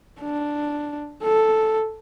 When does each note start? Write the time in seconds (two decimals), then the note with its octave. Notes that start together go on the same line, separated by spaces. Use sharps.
0.21 D4
1.23 A4